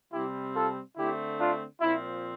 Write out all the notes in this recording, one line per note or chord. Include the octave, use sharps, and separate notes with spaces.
C3 G3 C4 E4 G4
F4 A4
D3 A3 C4 E4 G4
D4 F4
A#2 F3 C4 E4